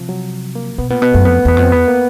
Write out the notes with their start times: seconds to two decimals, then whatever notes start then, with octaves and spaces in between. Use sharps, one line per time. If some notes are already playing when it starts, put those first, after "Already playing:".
Already playing: C3 F3
0.09 F#3
0.55 A#3
0.78 B2 B3
0.90 A#2 B3
1.02 B2 B3
1.14 F#2 A3
1.25 F2 B3
1.45 E2 B3
1.57 F2
1.63 C4
1.72 E2 B3
1.88 A#3